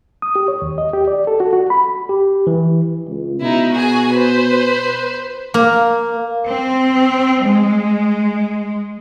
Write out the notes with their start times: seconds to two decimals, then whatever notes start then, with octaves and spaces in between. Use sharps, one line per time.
0.22 D#6
0.36 G4
0.48 C#5
0.62 D#2
0.78 D#5
0.93 G4
1.08 D5
1.27 A4
1.40 F#4
1.53 F#4
1.70 B5
2.09 G4
2.47 E3
3.08 C#2
3.41 B2 D#4 E4
3.72 F#4 G#4 G#5
4.13 B4 C5
5.54 A#3
6.48 C4
7.43 G#3